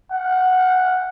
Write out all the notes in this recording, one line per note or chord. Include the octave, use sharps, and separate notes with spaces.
F#5